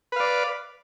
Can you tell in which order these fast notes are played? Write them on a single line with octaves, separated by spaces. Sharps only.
B4 F5 D5